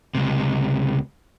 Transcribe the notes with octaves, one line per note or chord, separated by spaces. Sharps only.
C#2 C3